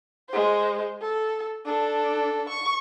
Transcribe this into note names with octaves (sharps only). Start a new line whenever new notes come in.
G#3 C5
A4
D4 A4
C#6